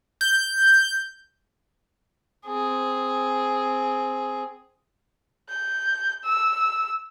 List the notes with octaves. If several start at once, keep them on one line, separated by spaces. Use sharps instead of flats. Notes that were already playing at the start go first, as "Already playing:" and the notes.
G6
C4 G#4
G6
E6